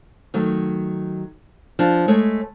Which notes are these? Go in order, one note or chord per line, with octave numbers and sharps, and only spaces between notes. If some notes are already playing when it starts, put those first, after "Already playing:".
D#3 F#3 A3
F3 D4
G#3 A3 C#5